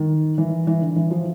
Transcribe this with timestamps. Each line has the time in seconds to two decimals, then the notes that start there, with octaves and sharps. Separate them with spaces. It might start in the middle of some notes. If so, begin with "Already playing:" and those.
Already playing: D#3
0.38 E3
0.67 E3
0.81 D3
0.96 E3
1.11 F3